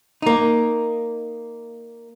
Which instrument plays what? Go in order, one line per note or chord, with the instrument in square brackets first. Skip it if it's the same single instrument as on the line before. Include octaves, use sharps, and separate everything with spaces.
[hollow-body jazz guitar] A#3 D#4